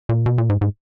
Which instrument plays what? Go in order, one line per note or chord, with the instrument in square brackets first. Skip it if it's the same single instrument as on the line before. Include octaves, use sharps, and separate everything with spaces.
[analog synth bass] A#2
B2
A#2
G#2
G#2